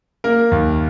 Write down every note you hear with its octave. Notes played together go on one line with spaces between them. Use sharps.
A#3 A#4
D#2